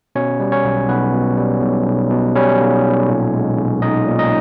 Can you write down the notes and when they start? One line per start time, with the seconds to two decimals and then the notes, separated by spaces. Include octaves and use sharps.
0.15 B2 C#4 C#5
0.40 G3
0.52 C#4 C#5
0.65 B1
0.89 B1 B3 B4
1.14 B2
1.37 G3
1.62 B1
1.87 B1
2.11 B2
2.36 G3 C#4 C#5
2.60 B1
2.85 B1
3.09 A#2
3.34 G#3
3.58 B1
3.82 B1 D#4 D#5
4.07 A#2
4.19 D#4 D#5